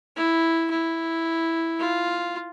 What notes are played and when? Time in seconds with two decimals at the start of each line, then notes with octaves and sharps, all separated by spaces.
0.17 E4
0.71 E4
1.80 F4